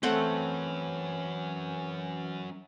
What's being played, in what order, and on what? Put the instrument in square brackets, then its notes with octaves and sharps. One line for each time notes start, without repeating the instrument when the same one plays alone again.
[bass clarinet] E3 [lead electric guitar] F#3 C#4 [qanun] A3 C4 F#5